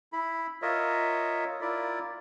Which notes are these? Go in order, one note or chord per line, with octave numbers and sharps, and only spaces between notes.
E4 B5
F4 A#4 C#5 D#5 E5
E4 F4 A#4 D5